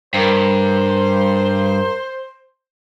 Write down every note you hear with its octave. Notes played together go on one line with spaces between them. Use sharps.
G2 A#4 C5 A#5